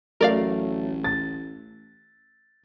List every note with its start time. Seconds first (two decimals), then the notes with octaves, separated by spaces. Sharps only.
0.21 A1 F#3 A3 A#4 D5 F5
1.04 A6